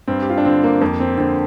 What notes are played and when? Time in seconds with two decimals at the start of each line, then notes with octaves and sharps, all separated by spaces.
0.08 G2 C4
0.22 G4
0.30 F4
0.38 D4
0.45 D3 C4
0.64 A#3
0.81 F2 A#3
1.00 C4
1.18 D3 C4